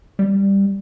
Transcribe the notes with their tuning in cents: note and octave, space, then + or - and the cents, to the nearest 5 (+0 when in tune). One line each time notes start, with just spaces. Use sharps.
G3 +10